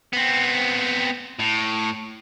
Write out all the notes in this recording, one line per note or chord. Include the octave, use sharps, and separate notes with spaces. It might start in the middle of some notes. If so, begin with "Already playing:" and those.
B3 C4
A2